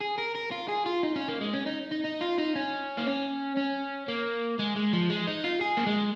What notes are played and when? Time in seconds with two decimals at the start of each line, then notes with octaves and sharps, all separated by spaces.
0.01 G#4
0.18 A#4
0.35 A#4
0.52 F4
0.69 G#4
0.86 F4
1.03 D#4
1.16 C#4
1.28 A#3
1.41 G#3
1.54 C#4
1.67 D#4
1.92 D#4
2.05 D#4
2.21 F4
2.38 D#4
2.56 C#4
2.98 A#3
3.07 C#4
3.57 C#4
4.08 A#3
4.59 G#3
4.76 G#3
4.93 F3
5.10 G#3
5.27 D#4
5.44 F4
5.61 G#4
5.77 A#3
5.86 G#3